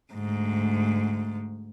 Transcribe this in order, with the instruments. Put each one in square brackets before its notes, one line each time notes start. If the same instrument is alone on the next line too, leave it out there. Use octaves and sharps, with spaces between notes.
[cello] D2 G#2